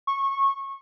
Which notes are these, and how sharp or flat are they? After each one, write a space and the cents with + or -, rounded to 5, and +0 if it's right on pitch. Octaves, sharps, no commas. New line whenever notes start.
C#6 -20